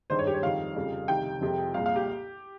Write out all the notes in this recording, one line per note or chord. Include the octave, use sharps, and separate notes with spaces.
G#1 G2 D#3 G#3 C5
C#5
G4
C#5
F2 D#3 G3 F5
F1 F2 C#3 G3
C2 C3 D#3 G3 G5
F2 C3 F3 G#3
C2 A#2 G#3 F5
F5
G4